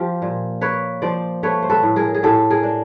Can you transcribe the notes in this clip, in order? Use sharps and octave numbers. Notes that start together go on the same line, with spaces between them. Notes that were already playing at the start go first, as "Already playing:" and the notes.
Already playing: F3 F4 G4
A#2
A#3 B4 C#5
F3 C5 D5
A3 B4 C#5
C5
A4 B4
A2
G#4 A#4
G#4
A2 G4 A4
G#4 A#4
D4